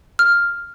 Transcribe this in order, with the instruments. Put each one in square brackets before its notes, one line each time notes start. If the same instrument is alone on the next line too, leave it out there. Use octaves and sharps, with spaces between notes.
[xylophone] F6